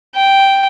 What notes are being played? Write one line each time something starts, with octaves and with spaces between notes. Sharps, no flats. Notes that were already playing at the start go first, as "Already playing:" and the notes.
G5